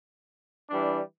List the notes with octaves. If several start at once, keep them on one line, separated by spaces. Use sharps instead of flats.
E3 G3 D4